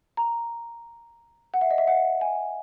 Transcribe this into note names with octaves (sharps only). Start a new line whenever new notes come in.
A#5
F#5
E5
D#5
E5
F#5
G#5